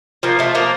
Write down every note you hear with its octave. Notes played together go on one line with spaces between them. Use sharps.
F3 A#3
F3 A3
F3 A#3